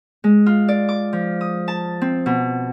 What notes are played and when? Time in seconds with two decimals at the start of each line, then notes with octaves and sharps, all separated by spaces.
0.24 G#3
0.46 F4
0.68 D5
0.89 D6
1.13 F3
1.41 D#6
1.68 A5
2.01 C4
2.26 B2